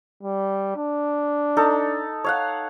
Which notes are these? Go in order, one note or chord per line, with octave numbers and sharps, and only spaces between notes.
G3
D4
D#4 A4
C#5 F5 F#5